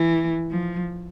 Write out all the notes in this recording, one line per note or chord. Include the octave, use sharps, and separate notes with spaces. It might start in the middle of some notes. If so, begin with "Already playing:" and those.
Already playing: E3
F3